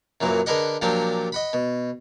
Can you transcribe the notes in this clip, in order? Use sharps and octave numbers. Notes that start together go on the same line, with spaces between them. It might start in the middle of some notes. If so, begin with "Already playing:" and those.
F#2 A#2 E3 F#3
D3 G#4 A#4 B4 D#5 F#5
A#2 F3 F#3 D4 G4
D#5 F#5 B5
B2